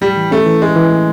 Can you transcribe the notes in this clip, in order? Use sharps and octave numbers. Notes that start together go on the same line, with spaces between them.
A2 G3
E3
A3 C#4
E3
E3 G#3
E3
A3